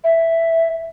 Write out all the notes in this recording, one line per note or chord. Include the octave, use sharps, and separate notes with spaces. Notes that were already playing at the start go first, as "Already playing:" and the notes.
E5